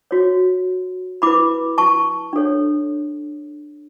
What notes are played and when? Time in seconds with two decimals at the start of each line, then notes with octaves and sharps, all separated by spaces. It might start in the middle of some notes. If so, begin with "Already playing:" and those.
0.11 F#4 C#5
1.22 E4 B4 B5 D6
1.78 A5 C#6
2.33 D4 A4 C#5